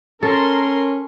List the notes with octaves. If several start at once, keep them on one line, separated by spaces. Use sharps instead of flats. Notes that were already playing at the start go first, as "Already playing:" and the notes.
C#4 A4 A#4 C6